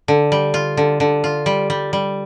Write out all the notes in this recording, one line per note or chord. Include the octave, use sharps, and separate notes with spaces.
D3
G3
F4
D3
D3
F4
G3
G3
G3